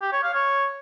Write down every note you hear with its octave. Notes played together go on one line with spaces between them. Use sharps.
G4
C#5
F5
C#5